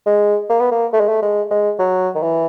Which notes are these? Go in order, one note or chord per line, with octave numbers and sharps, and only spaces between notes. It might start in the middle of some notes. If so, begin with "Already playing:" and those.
G#3
A#3
B3
A#3
A3
G#3
A3
G#3
G#3
F#3
D#3
E3